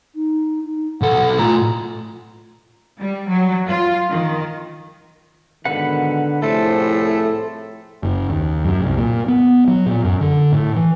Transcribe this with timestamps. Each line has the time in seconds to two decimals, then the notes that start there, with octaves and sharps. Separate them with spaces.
0.15 D#4
0.64 D#4
1.01 B1 A4 F#5
1.38 A2 F4 A#5
2.99 G3
3.29 F#3
3.69 F4
4.10 D#3
5.65 G#2 B2 D3 D#3 B4 F#5
6.42 C2 A2 F3 A3 G#4 A4 C5
8.03 F#1
8.30 D#2
8.65 F#2
8.81 C2
8.98 A#2
9.28 B3
9.68 F#3
9.86 A#2
10.04 F#2
10.21 D3
10.52 A2
10.76 E3